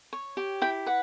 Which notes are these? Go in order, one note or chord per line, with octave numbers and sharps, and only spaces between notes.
C#5
G4
E4 G5
B4 F#5